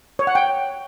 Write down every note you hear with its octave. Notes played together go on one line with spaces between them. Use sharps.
C#5
F#5
G5